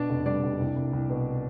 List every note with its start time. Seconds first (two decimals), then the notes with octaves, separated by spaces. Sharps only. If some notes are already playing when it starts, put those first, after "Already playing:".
Already playing: B2 D4 D5
0.09 F1
0.26 G3 D4 D5
0.43 F1
0.60 C2
0.76 C2
0.93 C2
1.09 B2